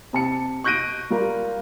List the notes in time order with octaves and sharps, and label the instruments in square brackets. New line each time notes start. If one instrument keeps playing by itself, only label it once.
[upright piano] C3 A5 C#7
C#6 F#6 G6 A#6 D7 D#7
G3 F4 A#4